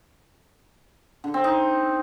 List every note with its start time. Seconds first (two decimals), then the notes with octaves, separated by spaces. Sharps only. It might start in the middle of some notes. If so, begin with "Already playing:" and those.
1.24 D3
1.34 C4
1.44 D#4